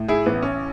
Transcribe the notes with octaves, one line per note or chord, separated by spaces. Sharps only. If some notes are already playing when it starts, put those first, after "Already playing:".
Already playing: A2
E4 G#4
A1 B3
C#4